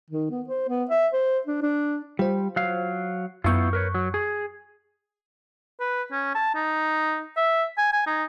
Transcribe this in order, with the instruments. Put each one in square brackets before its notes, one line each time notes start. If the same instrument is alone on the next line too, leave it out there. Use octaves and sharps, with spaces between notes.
[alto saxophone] D#3
B3
C5
B3
E5
C5
D4
D4
[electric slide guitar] G3 [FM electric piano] F4 C5
[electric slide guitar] F#3 F5
[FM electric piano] F#2 C#6 G6 [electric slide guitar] B3 E4 F4
[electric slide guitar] A#4 B4 C#5
F#3
G#4
[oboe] B4
C#4
A5
D#4
E5
G#5
G#5
D#4